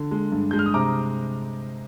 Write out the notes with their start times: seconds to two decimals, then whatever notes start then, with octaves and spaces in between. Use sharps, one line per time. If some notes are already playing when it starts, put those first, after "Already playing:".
Already playing: D3
0.11 G#3
0.32 G2
0.51 G#3 G6
0.59 F6
0.66 D#6
0.74 C3 A#5 D6